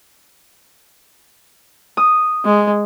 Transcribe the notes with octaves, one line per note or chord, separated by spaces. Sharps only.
D#6
G#3